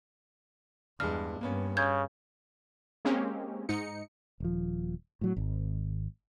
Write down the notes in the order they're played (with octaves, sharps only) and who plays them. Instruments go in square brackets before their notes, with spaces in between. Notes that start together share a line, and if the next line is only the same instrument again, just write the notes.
[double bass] E2 [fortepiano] G2 G#3 [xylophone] F6
[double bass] G2 [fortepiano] A#3 B3 C#4
[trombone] C#3 [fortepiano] C#4 [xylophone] G6 G#6
[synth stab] G#3 A#3 C4 C#4 G4
G#2 D#4 C#7
[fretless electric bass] D#1 F3
A2 F#3
G#1